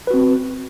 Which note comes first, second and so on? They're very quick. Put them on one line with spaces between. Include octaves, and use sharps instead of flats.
B4 F#4 C4